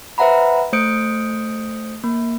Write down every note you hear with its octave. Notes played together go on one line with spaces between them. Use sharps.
B4 C5 E5 F#5 A#5 B5
A3 C5 D#6 G6 C#7 D7
A#3